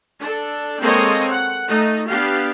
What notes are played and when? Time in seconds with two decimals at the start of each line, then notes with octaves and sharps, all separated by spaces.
0.21 D4 A4
0.82 G#3 A#3 C4 A4 C#5 D#5
1.31 F#5
1.66 A3 D#4
2.08 B3 D4 G4 F5